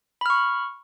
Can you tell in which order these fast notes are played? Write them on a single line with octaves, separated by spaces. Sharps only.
B5 F6 C#6